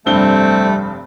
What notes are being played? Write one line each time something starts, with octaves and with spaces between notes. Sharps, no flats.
F1 G2 G3 A3 C4 G7